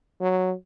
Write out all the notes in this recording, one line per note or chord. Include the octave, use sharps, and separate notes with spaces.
F#3